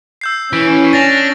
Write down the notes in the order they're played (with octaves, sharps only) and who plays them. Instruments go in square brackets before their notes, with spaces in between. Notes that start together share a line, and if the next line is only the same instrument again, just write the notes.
[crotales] E6 G6 C7
[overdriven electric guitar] E3 [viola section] C#4 [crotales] D7
[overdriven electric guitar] D4 [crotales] A6 A#6 F7